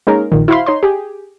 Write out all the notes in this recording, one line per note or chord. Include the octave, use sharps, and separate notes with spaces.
G#3 A#3 C#4 D#4 G#4 A#4
A#1 A#2 D#3
E4 F#4 C5 F5 B5 C6
D#4 C#5 C6
G4 G#4